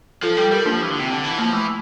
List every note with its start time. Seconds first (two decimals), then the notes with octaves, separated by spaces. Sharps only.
0.23 F3 F4 A4
0.37 G3 F4 A4
0.51 G3 G4 A#4
0.65 F3 A#3 D4
0.82 E3
0.90 D3
1.00 C3
1.10 D3
1.24 E3
1.38 F3 A#3
1.53 E3 A3